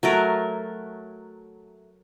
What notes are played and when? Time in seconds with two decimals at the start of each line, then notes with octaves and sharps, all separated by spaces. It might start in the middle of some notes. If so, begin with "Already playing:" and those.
0.03 F#3 A3 A#4